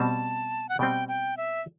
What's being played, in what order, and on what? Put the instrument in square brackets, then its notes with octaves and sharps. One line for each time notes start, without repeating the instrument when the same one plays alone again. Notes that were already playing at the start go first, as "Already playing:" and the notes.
Already playing: [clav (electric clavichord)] B2 G3 C4 [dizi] A5
[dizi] F#5
[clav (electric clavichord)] B2 G3 C4 [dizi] G5
[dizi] G5
E5